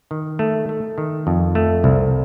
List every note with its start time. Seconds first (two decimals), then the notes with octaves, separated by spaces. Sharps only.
0.11 D#3
0.39 A3
0.69 A3
0.98 D#3
1.27 F2
1.55 A3
1.84 C2